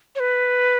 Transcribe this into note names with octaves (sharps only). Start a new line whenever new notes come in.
C#5
B4